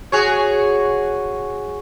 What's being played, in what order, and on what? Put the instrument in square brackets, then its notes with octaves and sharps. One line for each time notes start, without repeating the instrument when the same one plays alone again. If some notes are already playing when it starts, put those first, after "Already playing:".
[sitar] F#4 G#4 C#5